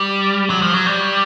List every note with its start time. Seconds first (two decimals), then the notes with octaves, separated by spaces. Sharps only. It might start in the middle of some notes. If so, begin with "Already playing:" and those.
Already playing: G3
0.50 F#3
0.62 F3
0.74 F#3
0.86 G3